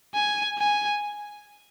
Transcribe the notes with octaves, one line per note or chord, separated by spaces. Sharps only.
G#5
G#5